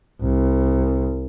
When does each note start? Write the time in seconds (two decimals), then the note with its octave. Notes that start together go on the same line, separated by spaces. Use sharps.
0.22 C2